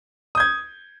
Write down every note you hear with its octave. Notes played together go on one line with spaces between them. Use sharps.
D#6 G6 G#6